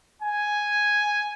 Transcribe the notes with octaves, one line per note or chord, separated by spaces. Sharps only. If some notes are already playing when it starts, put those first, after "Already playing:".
G#5